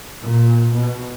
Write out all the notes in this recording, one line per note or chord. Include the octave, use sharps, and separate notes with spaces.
A#2
B2